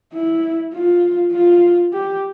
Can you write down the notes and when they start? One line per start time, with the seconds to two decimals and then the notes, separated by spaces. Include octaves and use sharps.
0.13 E4
0.74 F4
1.32 F4
1.93 G4